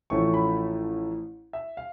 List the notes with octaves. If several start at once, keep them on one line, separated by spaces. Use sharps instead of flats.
A1 A2 F3 A3 C#4 C#6
B5
E5
F5